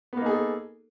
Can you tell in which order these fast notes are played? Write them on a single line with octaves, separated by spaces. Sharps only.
B3 A#3 D#4 G#4 A4